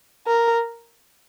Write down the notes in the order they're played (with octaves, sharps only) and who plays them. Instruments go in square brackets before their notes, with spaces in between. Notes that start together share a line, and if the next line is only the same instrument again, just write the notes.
[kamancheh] A#4